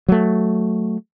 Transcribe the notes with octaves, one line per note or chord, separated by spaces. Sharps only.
F#3 A3